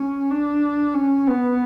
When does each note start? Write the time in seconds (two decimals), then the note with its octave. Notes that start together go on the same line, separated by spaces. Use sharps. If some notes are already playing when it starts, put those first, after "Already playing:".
Already playing: C#4
0.30 D4
0.94 C#4
1.27 B3